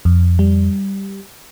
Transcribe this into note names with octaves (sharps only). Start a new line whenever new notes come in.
F2
G3